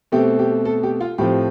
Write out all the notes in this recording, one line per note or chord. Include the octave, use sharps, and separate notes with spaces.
B2 A3 C4 G4
G4
A4
G4
F4
A2 F3 C4 G4